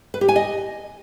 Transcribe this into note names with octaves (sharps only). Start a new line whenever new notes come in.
B4
G4
G#5
D#5